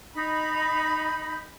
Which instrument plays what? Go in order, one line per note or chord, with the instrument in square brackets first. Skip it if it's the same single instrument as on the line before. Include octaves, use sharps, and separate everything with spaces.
[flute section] D#4 B5